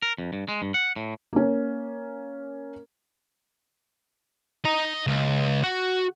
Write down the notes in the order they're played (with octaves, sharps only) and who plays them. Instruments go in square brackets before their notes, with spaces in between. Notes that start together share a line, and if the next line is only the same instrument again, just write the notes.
[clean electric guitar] A#4
F2
G2
G#3
G2
F#5
A2
[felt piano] A#3 C#4
[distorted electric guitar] D#5 A#5
C#2
F#4